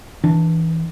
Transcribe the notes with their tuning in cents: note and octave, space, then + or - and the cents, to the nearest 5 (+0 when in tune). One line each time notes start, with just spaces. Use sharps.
E3 -20 D4 +0